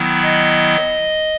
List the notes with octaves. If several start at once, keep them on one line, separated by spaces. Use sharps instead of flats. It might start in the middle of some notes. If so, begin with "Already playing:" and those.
Already playing: D#3 F#3 B3 E4
D#5